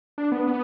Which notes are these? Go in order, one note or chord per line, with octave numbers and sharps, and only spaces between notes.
D4
B3
B3